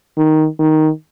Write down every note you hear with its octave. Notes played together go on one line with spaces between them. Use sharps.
D#3
D#3